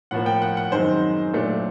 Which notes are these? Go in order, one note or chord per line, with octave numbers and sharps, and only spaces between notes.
A2 F3 A#3 F#5
G5
F#5
F#5
F#2 D#3 G#3 C4 D#4 C5
A#2 F#3 A3 D4